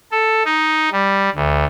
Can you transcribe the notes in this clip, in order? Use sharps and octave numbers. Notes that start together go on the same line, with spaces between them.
A4
D#4
G3
D2